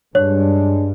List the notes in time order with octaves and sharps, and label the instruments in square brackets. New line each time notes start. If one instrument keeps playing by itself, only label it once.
[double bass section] G2 [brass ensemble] G#3 D4 [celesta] C#5